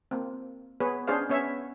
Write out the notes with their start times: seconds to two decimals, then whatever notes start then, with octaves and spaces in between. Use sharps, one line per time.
0.11 A#3 C4
0.80 B3 G#4 B4 C#5
1.07 C#4 D4 G#4 C5 F5
1.29 B3 C#4 C#5 E5